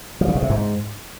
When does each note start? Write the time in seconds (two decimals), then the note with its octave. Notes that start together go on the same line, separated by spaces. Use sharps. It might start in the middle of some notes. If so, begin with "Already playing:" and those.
0.21 F3
0.28 C#3
0.35 B2
0.42 C3
0.50 G#2